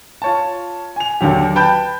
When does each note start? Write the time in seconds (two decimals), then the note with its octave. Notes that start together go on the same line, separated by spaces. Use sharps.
0.22 F4 C#5 A5
0.96 G#5 F7
1.21 D#2 D3 F#3 G4
1.56 B4 G5 A5 B5 G6